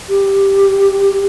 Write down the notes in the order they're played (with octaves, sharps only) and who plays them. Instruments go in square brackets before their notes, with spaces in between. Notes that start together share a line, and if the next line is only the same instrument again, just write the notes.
[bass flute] G4